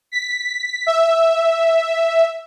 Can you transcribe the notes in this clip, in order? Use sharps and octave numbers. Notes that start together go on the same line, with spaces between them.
B6
E5